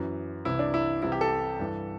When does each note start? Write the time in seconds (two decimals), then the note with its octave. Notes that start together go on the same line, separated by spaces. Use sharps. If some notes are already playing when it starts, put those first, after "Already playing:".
Already playing: F#2 E3
0.45 C2 C3 E3 E4
0.59 D4
0.74 E4
1.02 C2 C3 E3 E4
1.12 G4
1.21 A4
1.59 G2 E3